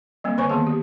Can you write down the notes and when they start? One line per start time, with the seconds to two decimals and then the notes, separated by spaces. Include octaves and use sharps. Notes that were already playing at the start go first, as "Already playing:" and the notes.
0.24 G3 A#3 C4
0.38 D3 C5 C#5 G#5 C#6
0.50 D#3 A#3 B3 G#4 A5
0.67 G4